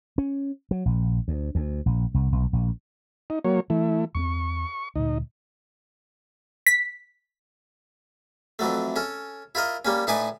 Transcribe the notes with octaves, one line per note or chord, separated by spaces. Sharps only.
C#4
F#3
A#1
D2
D2
A#1
C2
B1
A#1
D#4
F#3 A#3 C#5
E3 A3 E4
E2 B3 C4 C#6
D2 A#2 D#4
B6
F2 E3 F#3 A3
C#4 A4
E4 F4 A#4 D#5
G3 A#3 C#4
A2 D4 D#4 B4 G#5 D6